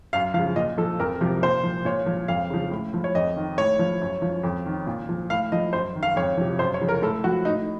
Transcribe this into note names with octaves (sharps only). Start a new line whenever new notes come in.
F#2 F5
C#3 F3 F5
A#2 D#5
F3 A4
F2 A#4
C3 F3
A#2 C5
F3
A#2 C#5
F3
F2 F5
C#3 F3
A2
F3
C#5
F2 D#5
D#3
A2 C#5
F3
F#2
F3
F2
D#3
A#2
F3
A2 F5
F3 D#5
F#2 C5
D#3
F5
F2 C#5
C3 F3
F#2 C5
C#5
C#3 F3
A#4
A2 A4
F3 F#4
A2 D#4